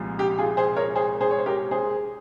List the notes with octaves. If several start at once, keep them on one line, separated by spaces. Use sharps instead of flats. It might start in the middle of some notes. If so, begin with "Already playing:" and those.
Already playing: C2 A#2 F3 G#3
G4
F4 G#4
G#4 C5
A#4 C#5
G#4 C5
G#4 C5
C#5
C5
G4 A#4
G#4 C5